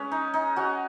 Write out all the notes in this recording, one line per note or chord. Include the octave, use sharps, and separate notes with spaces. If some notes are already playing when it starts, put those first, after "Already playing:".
Already playing: G#3 C#4 B4
D#4
D#4
C#4 F#4